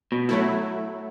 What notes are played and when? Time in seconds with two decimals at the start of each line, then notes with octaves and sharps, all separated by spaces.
0.12 B2
0.29 F#3 A3 E4